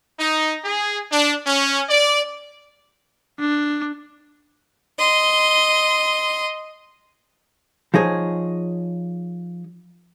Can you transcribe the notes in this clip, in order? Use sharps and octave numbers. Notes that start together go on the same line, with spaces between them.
D#4
G#4
D4
C#4
D5
D4
D#5 C6
F3 D#4 G#4 C#5